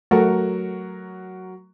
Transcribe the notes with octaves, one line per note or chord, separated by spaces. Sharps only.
F#3 A3 F#4 A#4